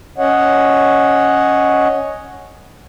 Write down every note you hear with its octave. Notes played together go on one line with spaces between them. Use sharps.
C#4 C#5 D#5 F#5